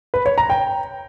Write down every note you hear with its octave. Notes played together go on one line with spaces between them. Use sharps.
B4
C#5
A#5
G5